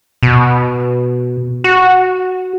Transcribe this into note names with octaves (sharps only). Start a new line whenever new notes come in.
B2
F#4